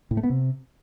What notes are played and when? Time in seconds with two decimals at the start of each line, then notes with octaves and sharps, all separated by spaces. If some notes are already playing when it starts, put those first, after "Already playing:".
0.11 A2
0.17 A3
0.23 B3
0.30 C3